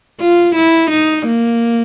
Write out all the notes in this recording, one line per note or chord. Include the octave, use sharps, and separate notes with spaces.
F4
E4
D#4
A#3